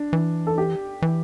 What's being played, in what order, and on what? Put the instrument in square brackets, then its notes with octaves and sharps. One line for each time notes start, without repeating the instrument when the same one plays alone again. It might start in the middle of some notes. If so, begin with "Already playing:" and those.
Already playing: [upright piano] D4
[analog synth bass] E3
[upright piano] A4
G4
[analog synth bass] E3